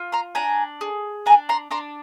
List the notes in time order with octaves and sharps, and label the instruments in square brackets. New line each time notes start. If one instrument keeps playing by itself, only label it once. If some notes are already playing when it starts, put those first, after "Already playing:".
Already playing: [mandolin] F4
A#5 C6
D4 G#5 A#5
G#4
D4 G#5 A#5
A#5 C6
D4 A#5 C6